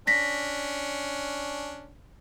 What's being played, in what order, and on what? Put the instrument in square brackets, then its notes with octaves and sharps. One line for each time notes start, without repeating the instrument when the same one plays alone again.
[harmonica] C#4 D4 [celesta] A#6 B6